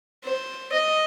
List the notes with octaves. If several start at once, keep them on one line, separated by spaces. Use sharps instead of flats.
C5
D#5